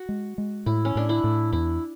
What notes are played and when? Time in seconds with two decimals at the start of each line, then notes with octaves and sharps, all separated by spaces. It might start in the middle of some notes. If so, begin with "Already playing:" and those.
Already playing: F#4
0.09 G#3
0.38 G#3
0.66 A2 E4
0.85 C#4
0.95 A2 D4
1.09 E4
1.24 A2
1.52 E2 E4